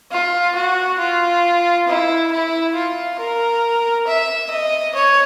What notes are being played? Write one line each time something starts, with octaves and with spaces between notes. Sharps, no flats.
F4
F#4
F4
E4
E4
F4
A#4
E5
D#5
C#5